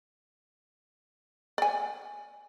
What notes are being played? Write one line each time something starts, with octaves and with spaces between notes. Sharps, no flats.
D5 G#5